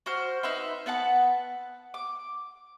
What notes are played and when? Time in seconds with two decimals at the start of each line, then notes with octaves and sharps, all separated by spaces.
0.06 F#4 C5 F6
0.43 D#4 B4 E5 C6
0.86 B3 B4 F#5 A5
1.94 D6